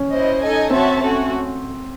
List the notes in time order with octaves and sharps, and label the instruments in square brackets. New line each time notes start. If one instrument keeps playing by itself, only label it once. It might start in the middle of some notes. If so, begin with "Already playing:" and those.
Already playing: [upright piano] C#4
[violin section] E4 C5 D#5
D#4 A4 D#5 G#5
[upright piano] C4 [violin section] F#4 C#5 E5 A5
[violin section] A3 C#4 F#4